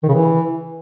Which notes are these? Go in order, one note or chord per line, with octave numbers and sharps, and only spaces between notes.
D#3
C#3
E3